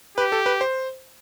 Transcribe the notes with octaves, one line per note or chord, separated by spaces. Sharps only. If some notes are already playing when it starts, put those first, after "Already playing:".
G4 B4
A4
B4
C5